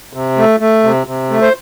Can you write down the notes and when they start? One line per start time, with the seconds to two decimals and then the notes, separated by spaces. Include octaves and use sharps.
0.13 C3
0.37 A3
0.60 A3
0.83 C3
1.07 C3
1.30 A3
1.41 C5